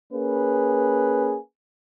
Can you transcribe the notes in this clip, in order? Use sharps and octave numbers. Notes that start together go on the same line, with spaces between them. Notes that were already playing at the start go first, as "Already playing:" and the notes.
A#3 C#4 G#4 B4